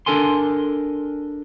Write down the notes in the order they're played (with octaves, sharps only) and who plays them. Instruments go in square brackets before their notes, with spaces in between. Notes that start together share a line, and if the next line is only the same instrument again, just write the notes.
[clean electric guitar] D4 A4 A#4 G#5 C6